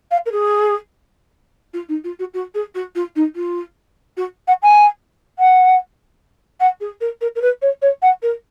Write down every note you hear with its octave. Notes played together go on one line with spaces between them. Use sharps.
F5
A#4
G#4
F4
D#4
F4
F#4
F#4
G#4
F#4
F4
D#4
F4
F#4
F#5
G#5
F#5
F#5
G#4
A#4
A#4
A#4
B4
C#5
C#5
F#5
A#4